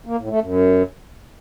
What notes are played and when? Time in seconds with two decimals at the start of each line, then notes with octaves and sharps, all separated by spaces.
0.06 A#3
0.18 A2
0.29 A3
0.41 F#2